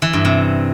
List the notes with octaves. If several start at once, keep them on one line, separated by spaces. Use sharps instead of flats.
E3
G2
C3